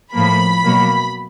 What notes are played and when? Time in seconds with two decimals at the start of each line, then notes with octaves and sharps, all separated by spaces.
0.13 A2 F3 A#3 B5
0.64 B2 F#3 A#3